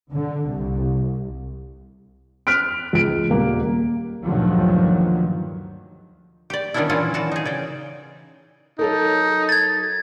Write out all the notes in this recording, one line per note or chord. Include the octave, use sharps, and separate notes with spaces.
D3
C2
F6 F#6 B6 D7
C#2 D7
D#1 A#3
D2 G2 A#2 D#3 F3 F#3
G4 D5
D#3 G3 B3 C#4 D4 E4
A#2 E3 F#3 A#3 C#4 F4
E3 F#4 A5
D#4 G#4
C#3 D5 G5
F#3 D#4 A4 A#4
G#6 A6